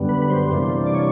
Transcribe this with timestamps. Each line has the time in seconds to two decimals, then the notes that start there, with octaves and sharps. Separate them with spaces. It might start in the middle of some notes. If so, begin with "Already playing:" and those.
Already playing: F#2 D3 G3 B3
0.09 B4
0.22 B4
0.30 C5
0.52 C3 E3 G3 A#3 D4
0.86 D5
0.95 C#5